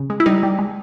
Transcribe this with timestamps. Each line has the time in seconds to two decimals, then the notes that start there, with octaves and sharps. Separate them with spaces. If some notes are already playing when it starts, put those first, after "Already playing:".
Already playing: C#3
0.10 G#3
0.20 E4
0.26 G3 D#4
0.43 G3
0.59 G#3